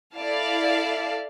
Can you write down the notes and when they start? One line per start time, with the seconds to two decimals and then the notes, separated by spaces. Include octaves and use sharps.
0.17 E4 A4 D5 F5 A5